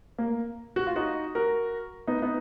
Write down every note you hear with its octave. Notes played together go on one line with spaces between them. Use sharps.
A#3
F#4
F4
D#4 F#4
F#4 A#4
B3 D#4
B3 D#4